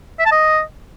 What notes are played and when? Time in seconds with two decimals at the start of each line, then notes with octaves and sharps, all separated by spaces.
0.19 E5
0.25 A5
0.32 D#5